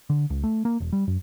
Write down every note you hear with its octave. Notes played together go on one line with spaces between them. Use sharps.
D3
C#2
A3
A#3
E1
G3
F#2